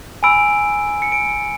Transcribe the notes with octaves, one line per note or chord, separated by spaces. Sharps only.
G#5 B5 E6 D7
C#7
D7